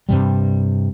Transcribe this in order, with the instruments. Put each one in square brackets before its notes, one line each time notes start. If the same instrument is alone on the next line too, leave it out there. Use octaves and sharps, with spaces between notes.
[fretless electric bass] G2 C3 G3